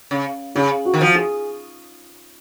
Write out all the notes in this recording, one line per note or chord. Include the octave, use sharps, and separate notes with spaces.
C#3
C#3 G#4
F#4
D#3
F3
G#4